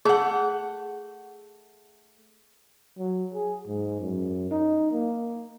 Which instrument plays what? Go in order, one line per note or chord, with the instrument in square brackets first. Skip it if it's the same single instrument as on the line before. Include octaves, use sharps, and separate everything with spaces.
[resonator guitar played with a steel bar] A3 F#5 [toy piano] G#4
[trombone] F#3
G#4
G#2
F#2
D#4
A#3